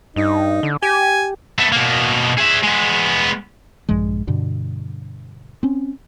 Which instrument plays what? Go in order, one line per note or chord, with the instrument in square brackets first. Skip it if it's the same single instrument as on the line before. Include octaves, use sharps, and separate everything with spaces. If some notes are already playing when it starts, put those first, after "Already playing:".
[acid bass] G2 [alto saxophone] D#4
[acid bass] D3
[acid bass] G4 [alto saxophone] G#5
[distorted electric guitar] A3 B3
B2 A#3
G#4 E5
G#3 B3
[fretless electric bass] A#1 G2 F3 G#3
G2 B2 D3
C4 C#4